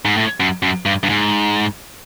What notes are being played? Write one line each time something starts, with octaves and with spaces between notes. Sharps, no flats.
G#2
A2
F#2
F#2
G2
G2
G#2